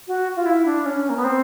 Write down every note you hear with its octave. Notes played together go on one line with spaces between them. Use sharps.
F#4
F4
E4
D4
C#4
A#3
B3
C4